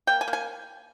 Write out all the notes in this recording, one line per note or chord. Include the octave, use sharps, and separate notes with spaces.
A#3 G5
G#5
A#3
G#5